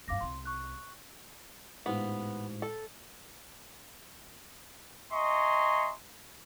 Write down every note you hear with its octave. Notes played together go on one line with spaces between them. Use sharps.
G2 B2 F5 D6 A#6
C2 C3 C6
C#6 F#6
A1 G#2 B3 F4
A4
D#5 E5 G#5 A#5 C6 C#6